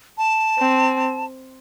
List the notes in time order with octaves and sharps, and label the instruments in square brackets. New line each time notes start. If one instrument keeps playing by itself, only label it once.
[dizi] A5
[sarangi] C4